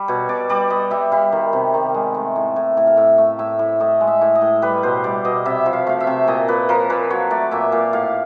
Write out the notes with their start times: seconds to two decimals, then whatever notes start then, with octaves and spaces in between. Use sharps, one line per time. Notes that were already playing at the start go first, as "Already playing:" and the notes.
Already playing: G3
0.08 B2 C#5
0.29 B2 D5
0.49 G3 D5
0.70 G3 D#5
0.91 G3 E5
1.12 G3 F5
1.32 D#3
1.53 C3
1.74 D#3
1.94 G#3
2.14 A3
2.36 A2
2.56 A2
2.77 A2
2.87 F5
2.97 A2 E5
3.18 A3
3.39 A2 E5
3.59 A2
3.80 A2 D#5
4.01 G#3
4.08 E5
4.21 A2
4.35 D#5
4.41 A2
4.62 G3 B4
4.83 B2 C5
5.04 G3 D5
5.25 B2 D#5
5.45 C3 E5
5.66 F3
5.73 F5
5.87 A3 F5
6.00 E5
6.07 C3
6.27 A#2 D#5
6.48 A#2 B4
6.69 F3 A#4
6.90 A#2 B4
7.10 F#3 C#5
7.30 A3 D5
7.51 A#2 E5
7.72 A#2 F5
7.93 A2 F5